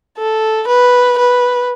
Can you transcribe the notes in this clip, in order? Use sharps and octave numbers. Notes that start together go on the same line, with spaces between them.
A4
B4
B4